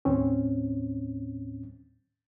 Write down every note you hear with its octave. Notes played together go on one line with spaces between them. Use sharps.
D#2 A2 C4 C#4